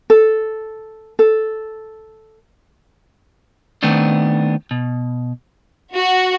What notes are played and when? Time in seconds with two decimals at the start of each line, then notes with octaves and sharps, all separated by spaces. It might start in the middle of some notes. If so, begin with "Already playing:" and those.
0.10 A4
1.19 A4
3.83 D#3 A3 B3 C4 D4
4.71 B2
5.96 F#4